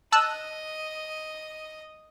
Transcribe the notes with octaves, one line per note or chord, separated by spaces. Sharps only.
D#5 A5 E6 F#6